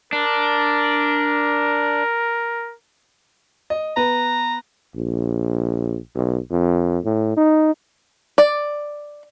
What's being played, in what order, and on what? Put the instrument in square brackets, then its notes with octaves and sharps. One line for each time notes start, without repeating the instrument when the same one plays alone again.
[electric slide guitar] D4 [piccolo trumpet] A#4
[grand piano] D#5
[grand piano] B3 B4 [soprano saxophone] A#5
[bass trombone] A#1
B1
F2
A2
D#4
[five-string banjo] D5